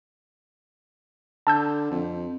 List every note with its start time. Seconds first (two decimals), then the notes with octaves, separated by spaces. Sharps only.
1.47 D3 A5 E6 G6
1.91 F2